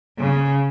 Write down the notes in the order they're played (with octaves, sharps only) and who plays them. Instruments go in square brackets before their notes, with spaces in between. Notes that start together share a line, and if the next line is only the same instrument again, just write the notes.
[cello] C#3